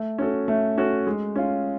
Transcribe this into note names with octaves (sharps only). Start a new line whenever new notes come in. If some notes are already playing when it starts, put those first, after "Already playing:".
Already playing: A3
C#4 F#4 A4
A3
C#4 F#4 A4
G#3
C#4 F4